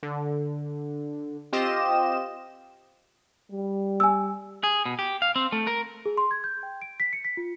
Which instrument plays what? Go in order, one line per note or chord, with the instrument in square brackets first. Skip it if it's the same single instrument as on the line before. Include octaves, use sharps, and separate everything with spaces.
[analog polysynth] D3
C4 F4 G4 D#5 E7
[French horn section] G3
[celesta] G#5 E6
[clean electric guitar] G#4
B2
G4
F5
C4
A3
A#4
[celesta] G#4
C6
G#6
G6
G5
D7
B6
C#7
B6
F4